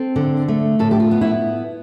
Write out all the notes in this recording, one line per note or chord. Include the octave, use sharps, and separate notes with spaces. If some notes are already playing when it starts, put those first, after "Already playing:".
Already playing: C4 A4
D3
A3
A2 A4
G4
F4
B3
E4